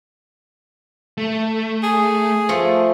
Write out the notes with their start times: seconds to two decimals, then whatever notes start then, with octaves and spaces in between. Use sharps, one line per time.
1.18 A3
1.83 G#4
2.49 F3 A3